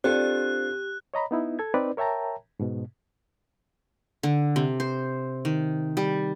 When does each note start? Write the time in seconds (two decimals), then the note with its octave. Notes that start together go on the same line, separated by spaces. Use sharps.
0.04 C4 D4 F4 G4 A4 F#6
1.14 C#5 D#5 A#5 B5
1.31 B3 D#4 E4
1.59 A4 G#6
1.74 C4 D#4 B4 D5
1.97 A#4 C#5 E5 G5 A5 A#5
2.60 G#2 B2
4.23 D3
4.56 C3
4.80 C5
5.45 D#3
5.97 G3